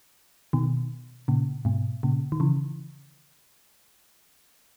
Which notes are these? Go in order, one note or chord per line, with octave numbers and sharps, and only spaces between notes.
B2 D#3
A#2 C#3
G#2 B2
A#2 C#3
D#3
C#3 E3